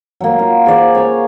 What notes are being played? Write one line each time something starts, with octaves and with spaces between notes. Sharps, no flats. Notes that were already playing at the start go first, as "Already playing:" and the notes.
F#3 A#3
F4
G#4 C5 D5
C#5 A#5